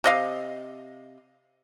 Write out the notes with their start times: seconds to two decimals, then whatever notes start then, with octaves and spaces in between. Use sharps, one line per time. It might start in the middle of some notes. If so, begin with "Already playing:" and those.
0.04 C3 D#5 F5